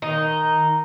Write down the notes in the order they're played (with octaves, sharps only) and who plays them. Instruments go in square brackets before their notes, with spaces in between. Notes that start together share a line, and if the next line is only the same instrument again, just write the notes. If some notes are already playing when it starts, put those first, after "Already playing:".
[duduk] D#3 [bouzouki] D#4